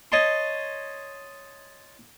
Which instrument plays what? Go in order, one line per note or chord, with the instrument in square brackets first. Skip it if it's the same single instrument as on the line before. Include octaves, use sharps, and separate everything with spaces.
[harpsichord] C#5 D#5 A5 C6